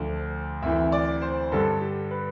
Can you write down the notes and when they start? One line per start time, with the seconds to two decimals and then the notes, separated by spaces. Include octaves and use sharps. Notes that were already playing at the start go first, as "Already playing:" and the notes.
Already playing: D2 D3 F3
0.62 D2 C3 E3 E5
0.92 D5
1.22 C5
1.52 G2 D3 G3 A4
1.82 G4
2.11 B4